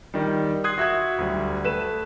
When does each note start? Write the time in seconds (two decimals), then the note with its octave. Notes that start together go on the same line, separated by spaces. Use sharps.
0.14 D#3 G3
0.64 C6 D#6 F#6 G#6 C7
0.78 F#4 E5 F#6 G#6
1.18 D2 F#3 G3
1.64 A3 B4 E7